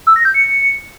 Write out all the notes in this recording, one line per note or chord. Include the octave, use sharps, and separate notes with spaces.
E6
A#6
G6
C#7